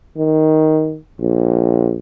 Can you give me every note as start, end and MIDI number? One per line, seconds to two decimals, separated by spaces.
0.17 0.98 51
1.20 1.98 34